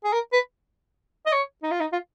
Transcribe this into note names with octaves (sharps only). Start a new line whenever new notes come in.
G#4
A#4
B4
D#5
C#5
D#4
F4
D#4
F4